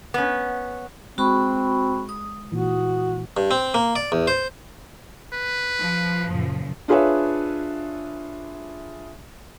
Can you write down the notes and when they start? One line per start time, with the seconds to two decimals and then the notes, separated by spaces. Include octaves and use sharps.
0.14 B3 C#4
1.18 G#3 C4 F#4 B5 C#6
2.09 D#6
2.52 A#2 E3 F#4
3.37 G2
3.51 C4
3.74 A#3
3.96 D5
4.12 E2
4.27 C5
5.33 B4
5.79 F3
6.24 F#2 A#2 C#3
6.88 D4 F4 G#4 B4 C#5 E5